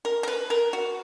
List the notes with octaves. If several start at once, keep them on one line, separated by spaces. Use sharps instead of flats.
A#4
A#4
B4
A#4
F#4